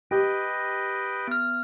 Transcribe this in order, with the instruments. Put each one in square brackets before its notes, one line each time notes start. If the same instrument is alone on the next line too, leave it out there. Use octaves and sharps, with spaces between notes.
[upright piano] G4 [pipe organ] B4 D#5 G5
[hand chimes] B3 F6